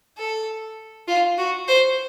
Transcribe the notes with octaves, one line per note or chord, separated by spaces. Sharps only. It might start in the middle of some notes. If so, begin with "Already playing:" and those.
A4
F4
F#4
C5